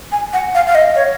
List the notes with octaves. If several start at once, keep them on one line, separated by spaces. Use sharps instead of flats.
G#5
F#5
F5
F5
D#5
C#5